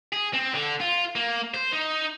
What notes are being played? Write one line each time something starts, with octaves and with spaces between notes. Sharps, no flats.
G#4
C4
D3
F4
A#3
C5
D#4